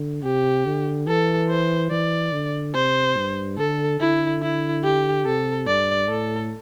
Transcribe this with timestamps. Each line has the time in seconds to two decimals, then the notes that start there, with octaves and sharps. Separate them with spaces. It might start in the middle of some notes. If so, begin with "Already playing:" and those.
Already playing: D3
0.24 C3 G4
0.66 D3
1.07 E3 A4
1.49 C5
1.91 E3 D5
2.33 D3
2.75 C3 C5
3.17 G2
3.58 D3 A4
4.00 D3 E4
4.42 E4
4.84 G4
5.26 C3 A4
5.67 G2 D5
6.09 A2 A4